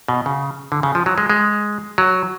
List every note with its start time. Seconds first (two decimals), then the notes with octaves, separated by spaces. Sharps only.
0.08 B2
0.26 C#3
0.72 D3
0.83 C#3
0.95 F3
1.06 F#3
1.18 G#3
1.30 G#3
1.98 F#3